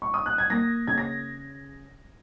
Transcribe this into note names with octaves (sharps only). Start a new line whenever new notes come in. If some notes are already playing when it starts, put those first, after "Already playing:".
C#6
D#6
F#6
G#6
A#3 A#6
C#3 G#6
A#6